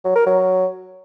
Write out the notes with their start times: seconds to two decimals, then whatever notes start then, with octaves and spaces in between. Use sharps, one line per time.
0.05 F#3
0.16 A#4
0.27 F#3